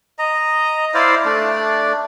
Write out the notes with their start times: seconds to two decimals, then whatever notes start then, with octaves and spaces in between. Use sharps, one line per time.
0.19 D#5 A#5
0.94 E4 C5 D5 F5
1.25 A3 D4 D5